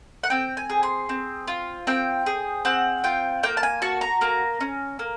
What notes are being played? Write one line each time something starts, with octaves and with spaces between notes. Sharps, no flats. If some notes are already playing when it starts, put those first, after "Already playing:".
F#5
C4 G5
G#5
G#4
C6
C4
F4
C4 G5
G#4
C4 F#5
F4 G5
A#3 G5
A5
G#5
F#4 A5
A#5
A#3 A#5
C#4
A#3